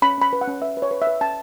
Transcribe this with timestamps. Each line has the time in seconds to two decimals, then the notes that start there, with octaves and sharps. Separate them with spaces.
0.02 C#4 B5
0.18 C#4 B5
0.33 B4
0.41 F#5
0.48 C#4
0.62 B4 E5
0.77 B4
0.82 C#5
0.91 B4
1.02 E5
1.07 B4
1.21 C#4 A5